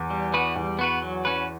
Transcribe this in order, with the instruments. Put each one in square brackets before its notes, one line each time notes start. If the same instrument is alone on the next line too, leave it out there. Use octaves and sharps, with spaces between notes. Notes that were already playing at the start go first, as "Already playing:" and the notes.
Already playing: [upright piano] E2
[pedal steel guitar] G3
B3 F#4 B4
[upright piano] E2 [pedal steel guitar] G3
[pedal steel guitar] B3 F#4 B4
F#3
C#4 F#4 B4